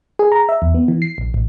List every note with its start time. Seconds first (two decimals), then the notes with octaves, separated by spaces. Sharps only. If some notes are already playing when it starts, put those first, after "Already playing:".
0.19 G#4
0.32 A#5
0.49 E5
0.62 E2
0.74 B3
0.88 E3
1.02 C7
1.18 A#1
1.34 A1